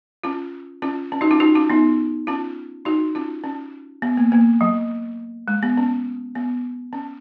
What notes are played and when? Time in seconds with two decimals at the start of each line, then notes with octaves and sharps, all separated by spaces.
0.24 C#4 F4
0.82 C#4 F4
1.12 C#4
1.21 D#4 F#4
1.31 C#4 F4
1.40 D#4 F#4
1.55 C#4 F4
1.70 B3 D#4
2.27 C#4 F4
2.85 D#4 F#4
3.15 C#4 F4
3.44 C#4
4.02 B3
4.17 A#3
4.32 A#3
4.61 F#3
5.48 G#3
5.63 B3
5.77 C#4
6.35 B3
6.93 C#4